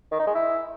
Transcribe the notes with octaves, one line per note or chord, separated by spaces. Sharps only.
D#3
D#4
G#3
E4